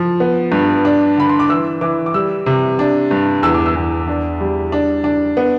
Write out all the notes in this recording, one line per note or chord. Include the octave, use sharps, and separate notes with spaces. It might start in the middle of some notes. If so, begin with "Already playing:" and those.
Already playing: F3
B3
G2
D4
D3 B5
C6
D6
E3 E6
E3 D6
D6
G3 E6
C3
D4
G2
E2 E6
D6
E6
E2
D4
G3
D4
D4
B3